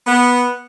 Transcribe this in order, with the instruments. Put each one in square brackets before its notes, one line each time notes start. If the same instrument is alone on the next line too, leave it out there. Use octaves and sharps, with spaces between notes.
[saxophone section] B3